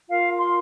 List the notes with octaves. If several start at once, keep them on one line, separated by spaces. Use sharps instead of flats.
F4 A#4 F5
C6